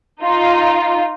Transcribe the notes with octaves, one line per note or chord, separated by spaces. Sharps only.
D#4 F4